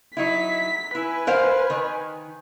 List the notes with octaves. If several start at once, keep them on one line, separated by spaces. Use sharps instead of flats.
F#3 D#4 E4 B6
E4 B4 G#5
A#4 C5 F5
D#3